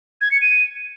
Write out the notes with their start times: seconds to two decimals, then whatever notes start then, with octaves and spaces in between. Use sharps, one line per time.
0.21 G#6
0.31 C#7
0.41 D#7